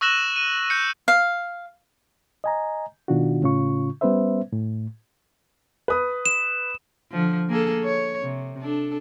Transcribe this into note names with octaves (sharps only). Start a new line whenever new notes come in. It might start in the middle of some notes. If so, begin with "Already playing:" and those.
C#6 E6 F#6 A#6 E7 F#7
D#7
G6 C#7
F5
D#5 G#5 A#5
B2 D#3 D4 F4 F#4
A2 C#3 C#4 F4 C#6
G3 B3 C#4 B4 C5 E5
A2
B4 D#6
E7
D3 F3
A#3 G#4 A4
C#5
C3
D4 A4